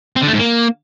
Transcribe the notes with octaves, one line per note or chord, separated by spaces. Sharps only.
C4
D3
A3
G#2
A#3